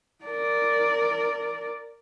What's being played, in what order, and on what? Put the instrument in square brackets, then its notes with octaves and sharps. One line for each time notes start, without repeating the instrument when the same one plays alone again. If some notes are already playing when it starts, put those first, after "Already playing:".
[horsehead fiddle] A#4 D5